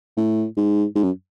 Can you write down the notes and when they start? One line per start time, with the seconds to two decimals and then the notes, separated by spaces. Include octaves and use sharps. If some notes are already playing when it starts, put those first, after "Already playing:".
0.17 A2
0.57 G#2
0.96 G#2
1.03 F#2